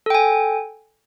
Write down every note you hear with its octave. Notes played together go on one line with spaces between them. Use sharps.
A4 G5 G#5